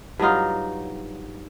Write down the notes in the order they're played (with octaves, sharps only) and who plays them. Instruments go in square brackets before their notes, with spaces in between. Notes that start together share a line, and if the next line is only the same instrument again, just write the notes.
[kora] G2 F#3 D#4 F4